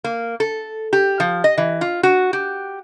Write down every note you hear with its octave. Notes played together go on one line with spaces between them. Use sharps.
A#3
A4
G4
F3
D#5
E3
F4
F#4
G4